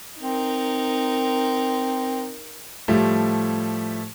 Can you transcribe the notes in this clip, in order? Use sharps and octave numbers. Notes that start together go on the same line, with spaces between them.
C4 D#4 A#4
A2 F3 G3 A3